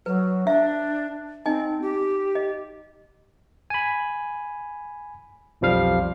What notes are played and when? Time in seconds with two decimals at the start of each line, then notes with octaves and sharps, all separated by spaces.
0.06 F#3 B4
0.47 D4 E5
1.46 C4 D#4 D#5 G#5
1.82 G4
2.35 D#5
3.70 G#5 B5
5.61 B1 F2 F3 G3 F5 F6